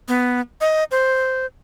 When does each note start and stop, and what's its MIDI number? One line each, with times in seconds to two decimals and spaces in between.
0.08 0.41 59
0.61 0.84 75
0.91 1.46 72